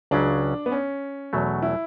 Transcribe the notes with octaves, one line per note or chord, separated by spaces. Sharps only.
C#2 C#3 F#3 C#4 D4
B3
C#4
E2 B2 F#3 A3
E4